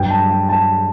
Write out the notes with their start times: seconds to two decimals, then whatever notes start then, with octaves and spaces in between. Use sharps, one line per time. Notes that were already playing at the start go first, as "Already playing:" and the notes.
Already playing: G2 F#3 G5
0.10 A5
0.30 G5
0.49 A5